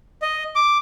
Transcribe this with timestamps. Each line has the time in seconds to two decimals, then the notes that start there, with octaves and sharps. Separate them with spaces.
0.22 D#5
0.56 D6